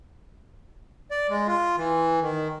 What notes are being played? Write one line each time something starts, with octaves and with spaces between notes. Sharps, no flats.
D5
G#3
F4
E3
D#3